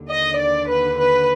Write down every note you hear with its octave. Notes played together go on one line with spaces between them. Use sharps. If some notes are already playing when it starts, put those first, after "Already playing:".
Already playing: D#2 D3
D#5
D5
B4
B4